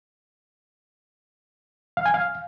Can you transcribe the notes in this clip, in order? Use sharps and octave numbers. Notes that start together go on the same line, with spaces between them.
F5
G#5
F5